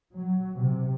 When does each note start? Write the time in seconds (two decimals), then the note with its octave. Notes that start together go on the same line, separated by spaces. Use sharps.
0.15 F#3
0.56 C3